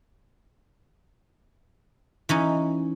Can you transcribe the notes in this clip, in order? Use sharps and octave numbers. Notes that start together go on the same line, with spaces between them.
E3 C#4 D#4